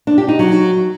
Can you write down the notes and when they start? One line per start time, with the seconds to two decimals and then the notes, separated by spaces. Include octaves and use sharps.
0.07 D4
0.18 G4
0.29 D#4
0.39 F#3